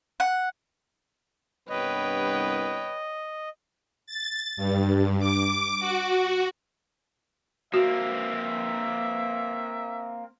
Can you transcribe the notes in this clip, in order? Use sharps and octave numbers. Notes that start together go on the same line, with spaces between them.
F#5
C2 G2 B3 B4 C#5 D#5 G5
A6
G2
D6
F#4
A#3 C4 F#4 E5